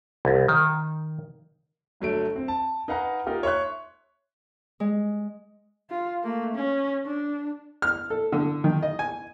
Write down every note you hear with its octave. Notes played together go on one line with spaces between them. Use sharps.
C2
D#3
G1 F#3 A3 D7
C4
A5
D#4 B4 F5 F#5 G#5 A#5
A#3 D#4 F4 G4 A#4
C#5 E5 C6 C#6 F#6
G#3
F4
A3 A#3
C#4
D4
F6
A4
D3
D#3
D#5
G#5